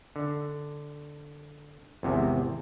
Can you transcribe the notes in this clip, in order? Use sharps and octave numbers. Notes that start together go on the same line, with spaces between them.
D3
G#1 E2 C3